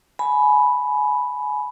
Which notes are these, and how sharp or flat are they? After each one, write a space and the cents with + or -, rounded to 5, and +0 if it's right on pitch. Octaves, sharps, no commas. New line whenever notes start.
G#5 +25 B5 +0